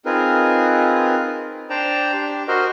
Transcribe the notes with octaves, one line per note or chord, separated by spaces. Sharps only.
C4 D#4 F4 G#4 A#4 B4
D4 C5 D5 G5 A5 A#5
D4 G4
F#4 A#4 C5 D#5 F#5